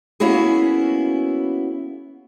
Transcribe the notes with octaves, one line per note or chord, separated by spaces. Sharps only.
A#3 B3 C#4 E4 F#4 G#4